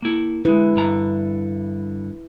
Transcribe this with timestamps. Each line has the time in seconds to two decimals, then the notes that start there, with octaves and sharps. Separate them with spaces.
0.02 A#3 E4
0.45 D3 G#3 E4 B4
0.76 G2 D3 A#5